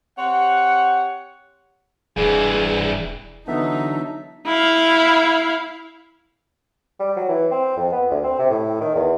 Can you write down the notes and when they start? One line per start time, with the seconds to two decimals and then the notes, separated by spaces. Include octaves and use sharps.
0.17 C4 G4 C#5 F#5
2.17 E1 G2 E3 G#4
3.48 D3 E3 F#3 B3 D#4 A4 E5
4.46 E4 F5
7.00 G3
7.16 F#3
7.29 E3
7.51 C4
7.77 F2
7.92 B3
8.11 D2
8.24 C4
8.39 C3
8.50 A2
8.81 D#3
8.94 E2